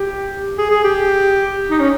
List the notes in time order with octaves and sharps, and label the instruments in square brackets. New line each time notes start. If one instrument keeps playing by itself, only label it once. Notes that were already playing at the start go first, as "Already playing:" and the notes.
Already playing: [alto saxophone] G4
G#4
G#4
G4
D#4
C#4